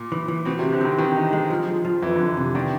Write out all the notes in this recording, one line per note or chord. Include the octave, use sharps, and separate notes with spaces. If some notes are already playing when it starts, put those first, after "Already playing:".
Already playing: A#2
E3
E3
B2 C4
C3
C4
D3
D#3 C4
D#3 E3
D#4
G#3
F3
F3
F3
F2 E3
D3
F2
C3
D#3 D4